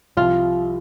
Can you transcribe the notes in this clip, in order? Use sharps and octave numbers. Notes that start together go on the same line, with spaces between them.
C2 C3 F3 F4